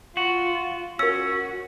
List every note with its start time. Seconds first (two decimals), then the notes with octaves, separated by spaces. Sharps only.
0.17 F4 F#4
0.99 C#4 F#4 A#4 E6